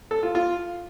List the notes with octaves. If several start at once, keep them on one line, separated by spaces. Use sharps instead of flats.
A4
F4
F4